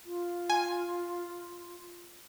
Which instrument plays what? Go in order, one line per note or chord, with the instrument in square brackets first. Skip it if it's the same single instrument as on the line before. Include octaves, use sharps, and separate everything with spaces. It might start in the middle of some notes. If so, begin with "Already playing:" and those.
[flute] F4
[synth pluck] G#5